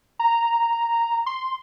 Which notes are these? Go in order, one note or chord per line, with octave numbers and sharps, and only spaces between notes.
A#5
C6